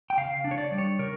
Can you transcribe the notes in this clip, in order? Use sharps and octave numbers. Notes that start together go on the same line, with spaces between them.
G5
C#3 F5
D4
C#5
D5
G3
C#5
C#3 A#4